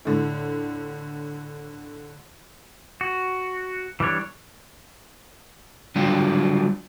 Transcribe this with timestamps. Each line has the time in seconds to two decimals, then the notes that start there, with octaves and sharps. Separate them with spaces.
0.05 A2 D3
3.01 F#4
4.00 E3 G3 D4 C#5
5.96 D3 F#3 G3 D4 F4